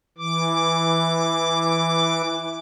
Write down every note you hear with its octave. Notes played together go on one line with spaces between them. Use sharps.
E3 D6